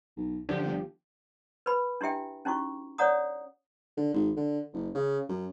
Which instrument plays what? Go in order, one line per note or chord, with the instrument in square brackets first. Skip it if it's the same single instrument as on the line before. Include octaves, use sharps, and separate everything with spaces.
[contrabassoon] B1
[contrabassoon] F#2 [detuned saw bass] D3 [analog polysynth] F3 G4
[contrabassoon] G1
[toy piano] B4 B5
D4 E4 G4 E5 G5
C#4 D#4 E4 F#4 C#6
C#5 D5 F#5 A#5 D#6
[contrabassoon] D3
G#1
D3
F#1
C#3
F#2